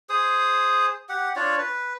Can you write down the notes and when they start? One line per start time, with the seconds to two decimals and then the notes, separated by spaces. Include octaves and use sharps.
0.09 G#4 C5 D#6
1.09 G4 F#5
1.36 D4 F4 C#5 D5
1.58 B4